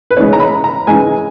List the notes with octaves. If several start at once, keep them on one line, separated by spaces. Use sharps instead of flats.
B4
C#3 E3 G#3 C#5
A#5
B5
A#5
C#3 E3 G#3 G#5